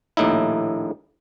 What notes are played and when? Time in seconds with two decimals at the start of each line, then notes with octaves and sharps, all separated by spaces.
0.17 A#1 D#2 A2 D#4 E4